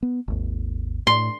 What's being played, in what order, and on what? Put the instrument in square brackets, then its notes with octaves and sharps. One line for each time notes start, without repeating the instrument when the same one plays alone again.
[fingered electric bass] B3
G#1 D#2
[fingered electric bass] A2 [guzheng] C6